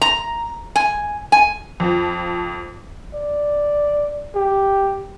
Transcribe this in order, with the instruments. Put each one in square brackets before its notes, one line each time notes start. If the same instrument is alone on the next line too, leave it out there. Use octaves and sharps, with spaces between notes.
[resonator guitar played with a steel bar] A#5
G#5
G#5
[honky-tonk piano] F2 F3
[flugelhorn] D5
G4